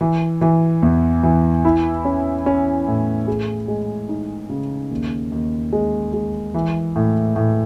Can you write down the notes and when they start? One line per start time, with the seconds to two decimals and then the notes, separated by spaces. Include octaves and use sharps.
0.01 E3
0.41 E3
0.83 E2
1.23 E3
1.65 E4
2.05 C#4
2.46 C#4
2.87 A2
3.27 G#4
3.68 G#3
4.09 D#4
4.49 C#3
4.91 D#2
5.32 D#2
5.73 G#3
6.13 G#3
6.54 E3
6.96 A2
7.36 A2